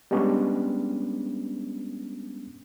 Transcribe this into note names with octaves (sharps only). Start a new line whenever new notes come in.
G3 G#3 B3 C#4 D4